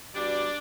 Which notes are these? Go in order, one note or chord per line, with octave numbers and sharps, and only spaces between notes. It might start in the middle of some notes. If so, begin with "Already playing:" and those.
B2 G3 D4 D5